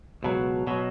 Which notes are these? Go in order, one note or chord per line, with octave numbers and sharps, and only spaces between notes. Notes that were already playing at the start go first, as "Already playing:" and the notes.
C#2 B2 F#3
B2 F#3